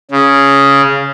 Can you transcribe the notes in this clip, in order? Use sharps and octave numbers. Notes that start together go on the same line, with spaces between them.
C#3